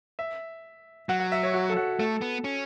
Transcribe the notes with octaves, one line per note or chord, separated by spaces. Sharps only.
E5
F#3 F#5
F#5
E5
C#5
F#4
A4
F#4
A3 A4
B3
C#4